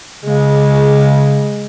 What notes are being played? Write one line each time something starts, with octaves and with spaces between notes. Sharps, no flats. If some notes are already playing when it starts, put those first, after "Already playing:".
C#3 G#3